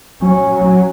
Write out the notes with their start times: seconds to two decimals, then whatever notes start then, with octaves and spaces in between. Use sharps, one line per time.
0.22 F#3 C#4